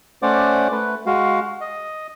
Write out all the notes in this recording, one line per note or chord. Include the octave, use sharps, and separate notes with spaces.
A3 C#4 C5 D5 F#5 D6
A3 B4
G#3 F#4 F5
D#5